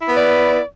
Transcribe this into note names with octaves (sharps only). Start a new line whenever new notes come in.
B3 E4 B4 D5